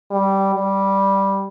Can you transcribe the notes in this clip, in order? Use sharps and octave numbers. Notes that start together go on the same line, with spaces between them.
G3
G3